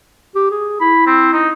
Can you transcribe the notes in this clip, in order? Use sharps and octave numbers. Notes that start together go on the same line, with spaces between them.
G4
G#4
E4 B5
C4
D#4